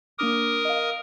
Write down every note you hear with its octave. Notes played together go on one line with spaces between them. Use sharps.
A#3 D4 A#4 D6 D#6
D#5 F5